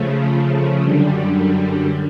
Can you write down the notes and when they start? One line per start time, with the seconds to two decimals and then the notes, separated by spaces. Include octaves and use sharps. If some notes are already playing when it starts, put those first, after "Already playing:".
Already playing: C#3 F3 A3
0.81 F#2 D3 G3